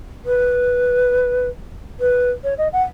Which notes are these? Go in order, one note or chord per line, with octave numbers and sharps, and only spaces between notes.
B4
B4
C#5
D#5
F#5